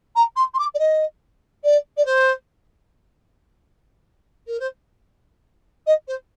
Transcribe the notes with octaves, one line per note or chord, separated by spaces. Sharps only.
A#5
C6
C6
D6
D5
D#5
D5
D5
C5
A#4
C5
D#5
C5